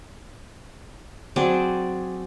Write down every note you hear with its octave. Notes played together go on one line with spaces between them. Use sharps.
F#3 C4 G#4 D5